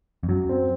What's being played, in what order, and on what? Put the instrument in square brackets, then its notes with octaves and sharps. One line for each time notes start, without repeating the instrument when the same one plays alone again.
[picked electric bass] F2
[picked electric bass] F#2 [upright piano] F#3
[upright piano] C4